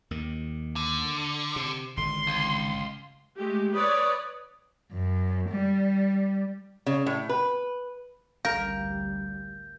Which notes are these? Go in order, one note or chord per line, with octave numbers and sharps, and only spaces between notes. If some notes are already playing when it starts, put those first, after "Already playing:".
D#2 D#3
D3
C3
G#1 D3 C6
C#2
G#3 A3 G4
B4 C#5 D5 D#6
F#2
G3
C#3
A2
B4
A1 D2 G3 A#4 F5 G6